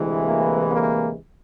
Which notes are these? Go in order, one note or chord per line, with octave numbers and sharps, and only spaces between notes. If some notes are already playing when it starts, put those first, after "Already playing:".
Already playing: D2 C3 E3 G#3
A#3
A#3